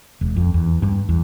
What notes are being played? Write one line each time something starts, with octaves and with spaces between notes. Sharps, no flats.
E1
F2
E2
G2
E2